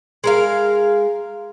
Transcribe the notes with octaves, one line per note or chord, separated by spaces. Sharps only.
G#3 A#4 F5